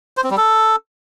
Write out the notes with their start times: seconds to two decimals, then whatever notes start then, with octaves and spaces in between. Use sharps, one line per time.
0.17 C5
0.24 C4
0.31 G3
0.37 A4